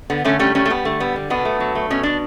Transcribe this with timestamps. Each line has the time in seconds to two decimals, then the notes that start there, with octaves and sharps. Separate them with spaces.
0.10 D3 B3
0.24 D3 A3 C#4
0.39 G3 A3 C#4
0.55 G3 A3 C#4
0.66 A3
0.70 G3 B3
0.85 D3 A3
1.00 G3 B3
1.16 D3
1.30 B2 B3 D4
1.45 A3
1.60 F#3
1.75 A3
1.90 B2 C#4
2.03 B2 D4